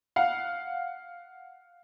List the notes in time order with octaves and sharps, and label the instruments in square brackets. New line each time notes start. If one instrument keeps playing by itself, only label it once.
[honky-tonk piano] F5 F#5